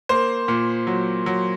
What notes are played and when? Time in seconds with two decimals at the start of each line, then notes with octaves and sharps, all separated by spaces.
0.09 A#3 C5
0.48 A#2
0.87 F#3
1.26 F#3